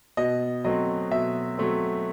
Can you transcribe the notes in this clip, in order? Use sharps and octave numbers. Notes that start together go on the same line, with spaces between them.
B2 D#5
F#3 A3 C4 D#5
B2 E5
F#3 A3 C4